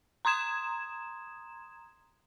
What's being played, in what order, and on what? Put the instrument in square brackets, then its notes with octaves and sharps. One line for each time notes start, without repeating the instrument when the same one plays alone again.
[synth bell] A#5 C6 D#6 G#6 E7